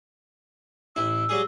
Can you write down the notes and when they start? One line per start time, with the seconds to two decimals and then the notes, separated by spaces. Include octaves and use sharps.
0.96 A1 E4 E6
1.29 F#3 G3 G#4